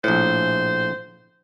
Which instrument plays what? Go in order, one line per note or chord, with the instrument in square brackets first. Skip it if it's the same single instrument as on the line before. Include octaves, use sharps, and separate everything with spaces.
[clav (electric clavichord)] A#1 A2 [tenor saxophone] C5